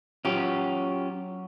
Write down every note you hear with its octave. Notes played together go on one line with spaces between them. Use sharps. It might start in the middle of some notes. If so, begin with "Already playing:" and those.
F#3 C#4 F4 G4